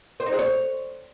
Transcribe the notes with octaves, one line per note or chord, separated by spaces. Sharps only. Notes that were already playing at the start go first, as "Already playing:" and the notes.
C5
D#4
G#4
C#5